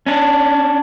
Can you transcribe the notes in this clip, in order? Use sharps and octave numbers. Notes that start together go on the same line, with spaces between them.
C#4 D4